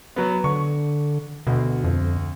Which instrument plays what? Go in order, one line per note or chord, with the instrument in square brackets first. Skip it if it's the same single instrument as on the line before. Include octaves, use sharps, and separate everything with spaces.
[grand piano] F#3 B3
[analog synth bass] D3 [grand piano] C#6
[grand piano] D2 [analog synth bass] B2
[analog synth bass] F2